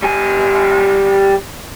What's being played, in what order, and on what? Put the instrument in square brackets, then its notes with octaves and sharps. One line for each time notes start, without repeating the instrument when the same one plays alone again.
[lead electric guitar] G3 G#5